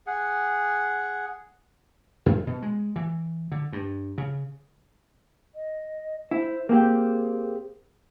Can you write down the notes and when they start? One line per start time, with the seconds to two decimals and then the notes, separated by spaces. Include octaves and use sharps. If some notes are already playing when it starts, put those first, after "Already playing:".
0.07 G#4 F#5
2.26 F#2
2.47 B2
2.62 G#3
2.96 E3
3.52 D3
3.72 G2
4.18 C#3
5.55 D#5
6.31 E4 C5
6.69 A#3 C4 G4 G#4